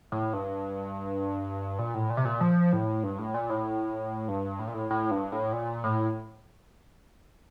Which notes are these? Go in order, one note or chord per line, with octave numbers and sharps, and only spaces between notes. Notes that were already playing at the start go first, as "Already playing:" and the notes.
A2
G2
A#2
A2
A#2
C3
A#2
F3
A2
G2
A2
A#2
A2
G2
A2
A#2
A2
A2
G2
A2
A#2
A2